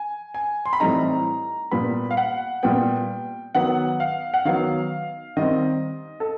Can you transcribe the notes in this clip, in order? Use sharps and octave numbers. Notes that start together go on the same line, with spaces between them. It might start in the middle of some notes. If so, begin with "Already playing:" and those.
Already playing: G#5
G#5
C6
B5
A2 E3 G3 C4 D#4 A#5
A#2 G3 B3 B5
F5
F#5
A#2 G3 B3 G5
D#3 F#3 B3 F#5
F5
F#5
D#3 F#3 B3 F5
D#3 G3 C4 D#5
A4